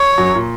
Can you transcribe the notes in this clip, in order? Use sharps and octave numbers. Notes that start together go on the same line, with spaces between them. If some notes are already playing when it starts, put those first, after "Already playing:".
Already playing: C#5
F#2 F#3
A#2